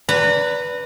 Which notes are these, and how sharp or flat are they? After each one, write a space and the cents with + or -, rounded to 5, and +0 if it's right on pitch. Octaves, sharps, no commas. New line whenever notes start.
B4 +0 D5 -20 A#5 -30